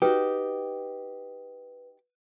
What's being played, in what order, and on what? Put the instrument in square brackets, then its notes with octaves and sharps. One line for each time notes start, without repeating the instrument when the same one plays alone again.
[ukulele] D#4 F#4 [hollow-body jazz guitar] G4 [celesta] B4